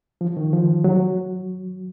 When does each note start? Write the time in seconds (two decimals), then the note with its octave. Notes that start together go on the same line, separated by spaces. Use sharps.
0.21 F3
0.37 D#3
0.53 F3
0.84 F#3